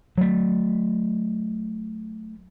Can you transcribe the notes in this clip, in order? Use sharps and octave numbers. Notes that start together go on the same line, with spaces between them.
F#3 A3